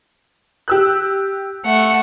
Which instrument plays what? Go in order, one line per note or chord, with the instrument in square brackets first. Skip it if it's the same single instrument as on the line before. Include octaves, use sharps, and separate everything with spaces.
[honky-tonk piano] G4 E6 F#6
[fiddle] A3 F#5